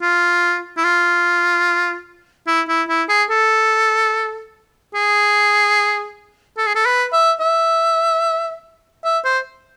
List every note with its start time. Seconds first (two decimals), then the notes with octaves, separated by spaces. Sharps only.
0.02 F4
0.77 E4
0.84 F4
2.47 E4
2.68 E4
2.89 E4
3.09 G#4
3.30 A4
4.95 G#4
6.58 A4
6.67 G#4
6.75 A4
6.86 B4
7.13 E5
7.40 E5
9.04 E5
9.25 C5